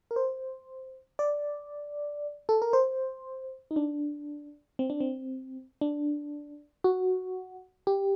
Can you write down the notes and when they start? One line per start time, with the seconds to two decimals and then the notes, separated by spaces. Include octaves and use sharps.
0.11 A#4
0.16 C5
1.19 D5
2.49 A4
2.62 A#4
2.73 C5
3.71 D#4
3.76 D4
4.79 C4
4.90 D4
5.00 C4
5.81 D4
6.84 F#4
7.87 G4